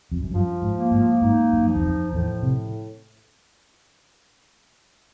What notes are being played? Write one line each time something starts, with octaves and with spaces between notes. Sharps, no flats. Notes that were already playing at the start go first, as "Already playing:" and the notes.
F2
F#2
G2 F3
G#2
A#3
G#2
G#2 D#4
F#2
F3
E2
F2
E2 A2
C3